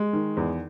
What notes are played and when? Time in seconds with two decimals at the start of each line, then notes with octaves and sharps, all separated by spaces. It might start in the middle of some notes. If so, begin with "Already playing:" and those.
Already playing: G#3
0.13 D#3
0.37 E2